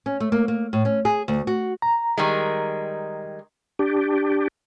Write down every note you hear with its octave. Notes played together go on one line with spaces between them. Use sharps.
C#4
A3
A#3
A#3
A2
C#4
G#4
D2
F#4
A#5
D#3 G3 G#3
D4 G4